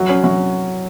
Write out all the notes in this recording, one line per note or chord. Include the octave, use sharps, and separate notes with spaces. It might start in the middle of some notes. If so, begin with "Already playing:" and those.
Already playing: F#3
C#4
F#3